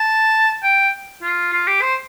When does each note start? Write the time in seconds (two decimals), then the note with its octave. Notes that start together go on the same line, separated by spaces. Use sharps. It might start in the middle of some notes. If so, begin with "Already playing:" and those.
Already playing: A5
0.63 G5
1.23 F4
1.53 F4
1.67 G4
1.82 C5